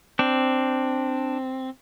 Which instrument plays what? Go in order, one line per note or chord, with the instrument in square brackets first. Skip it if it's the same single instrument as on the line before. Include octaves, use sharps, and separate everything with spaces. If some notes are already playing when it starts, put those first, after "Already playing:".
[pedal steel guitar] C4 [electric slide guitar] D4